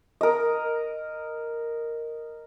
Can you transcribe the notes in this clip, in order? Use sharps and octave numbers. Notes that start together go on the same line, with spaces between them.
A#4 D#5